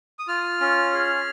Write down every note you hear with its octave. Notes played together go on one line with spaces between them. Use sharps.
D#6
F4 F6
C#4
G#4